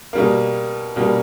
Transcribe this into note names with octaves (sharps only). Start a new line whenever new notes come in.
B2 G3 A#3
B2 G3 A#3